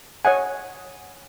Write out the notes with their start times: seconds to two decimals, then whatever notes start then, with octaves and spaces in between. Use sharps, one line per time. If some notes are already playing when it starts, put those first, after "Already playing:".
0.25 C#5 D#5 F#5 G#5